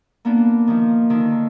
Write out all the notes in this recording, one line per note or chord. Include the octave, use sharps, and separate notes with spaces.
A#3 B3 D4
D#3 F3
D3 D#3